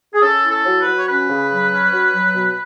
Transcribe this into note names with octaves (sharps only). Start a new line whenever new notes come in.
G#4
C#4 A4
E4
A4
F#3
B4
F#3
C#5
C#4 B4
C#3
F#3
C#4
F#3
F#3
B2